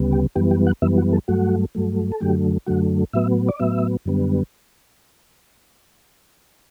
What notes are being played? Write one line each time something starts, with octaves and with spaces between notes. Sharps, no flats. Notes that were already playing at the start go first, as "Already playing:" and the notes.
Already playing: D2 C#3 G3 B3
G4
F#2 E3 G3 B3 G4
G4
F#5
F#2 E3 G3 B3 E5
F#4
A4
G2 F#3 A3 F#4
G2 F#3 A3
A4
F#2 D3 F#3 A3 G4
F#2 D3 F#3 A3 F#4
A2 F#3 B3 E5
D5
A2 F#3 B3 E5
F#2 D3 G3 B3